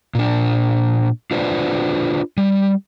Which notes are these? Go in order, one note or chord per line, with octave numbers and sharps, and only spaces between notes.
A#2 D4
D4 F4 B4 C5 D5
G3